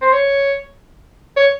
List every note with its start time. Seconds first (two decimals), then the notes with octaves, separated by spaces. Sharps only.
0.02 C5
0.13 C#5
1.37 C#5